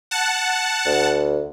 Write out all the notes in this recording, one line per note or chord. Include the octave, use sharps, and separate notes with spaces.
F#5 A5
D2